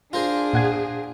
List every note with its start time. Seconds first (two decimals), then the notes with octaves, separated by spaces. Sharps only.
0.13 D4 F4 G#4 A#4 C5
0.53 A#2 F#5 G#6